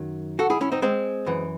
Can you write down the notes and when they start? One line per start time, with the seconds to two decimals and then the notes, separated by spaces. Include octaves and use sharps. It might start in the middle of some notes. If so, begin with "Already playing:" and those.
Already playing: F#2 D#3 F#3
0.39 F#4 A4
0.50 E4 G#4
0.61 C#4 E4
0.72 C4 D#4
0.82 G#3 C4
1.26 F#2 E3